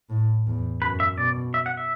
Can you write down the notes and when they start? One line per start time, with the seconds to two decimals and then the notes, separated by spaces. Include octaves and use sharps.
0.10 A2
0.47 E2
0.82 F#2 B4
1.00 E5
1.17 B2 D5
1.54 E5
1.66 F#5
1.77 E5